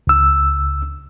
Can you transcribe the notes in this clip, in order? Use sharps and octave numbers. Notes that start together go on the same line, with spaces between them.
C#2 E6